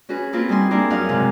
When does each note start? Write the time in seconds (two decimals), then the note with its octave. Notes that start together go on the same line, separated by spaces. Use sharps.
0.09 C#4 F#4 G#4 B4
0.33 A#3 C4 F4 A#4 B4
0.49 G3 D#4 G#5 C6
0.71 A#3 D4 E4 F4 G#4 A#4
0.90 F#2 D#4 F5 F#5 G#5
1.09 G#2 C3 G#3